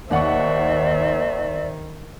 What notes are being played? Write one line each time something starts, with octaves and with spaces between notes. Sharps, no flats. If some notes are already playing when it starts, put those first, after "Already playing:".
D#2 D#3 C5 D5 E5 F#5 C#6